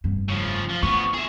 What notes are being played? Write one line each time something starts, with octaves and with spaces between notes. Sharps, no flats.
F1 G2
C#3 F3
F3
D3 F3 B3 C#6
G#4 E5